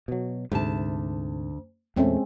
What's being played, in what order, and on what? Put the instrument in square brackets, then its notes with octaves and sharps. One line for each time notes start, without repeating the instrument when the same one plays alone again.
[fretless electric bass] B2 F#3
[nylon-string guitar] D2 A5 [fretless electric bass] G#2 C3
[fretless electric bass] E2 A#2 A3 [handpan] G#3 C4 C#4